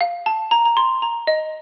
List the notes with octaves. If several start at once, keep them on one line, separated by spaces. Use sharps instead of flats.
F5
A5
A#5
A#5
C6
A#5
D#5